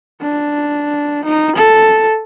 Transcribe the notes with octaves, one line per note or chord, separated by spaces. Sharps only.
D4
D#4
A4